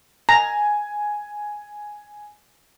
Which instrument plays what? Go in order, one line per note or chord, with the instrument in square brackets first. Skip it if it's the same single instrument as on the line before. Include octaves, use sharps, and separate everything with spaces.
[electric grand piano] G#5 [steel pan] A#5